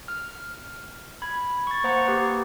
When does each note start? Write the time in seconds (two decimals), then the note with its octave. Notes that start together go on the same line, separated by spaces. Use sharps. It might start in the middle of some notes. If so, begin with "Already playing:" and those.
0.08 F6
1.22 B5 G#6
1.67 C#6 A6
1.84 A#3 C5 F#5 A#5 A6 C#7
2.07 A#3 G4 B4